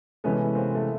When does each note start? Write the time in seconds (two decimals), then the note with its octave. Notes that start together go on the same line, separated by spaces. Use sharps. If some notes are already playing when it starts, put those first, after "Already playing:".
0.24 C3 E3 G#3 A3 B3 C#4
0.55 A#3 C4
0.75 A3